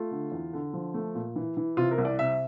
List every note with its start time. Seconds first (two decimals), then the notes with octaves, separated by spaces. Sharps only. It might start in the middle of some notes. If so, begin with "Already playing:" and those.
Already playing: A3 F4
0.11 D3
0.32 E2
0.53 D3
0.73 F3
0.94 A3
1.15 A#2
1.36 E3
1.57 E3
1.77 C3 F4
1.91 A#4
1.98 C2
2.05 D5
2.19 C3 E5